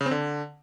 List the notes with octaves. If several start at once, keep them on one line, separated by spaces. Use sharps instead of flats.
C#3
C4
D3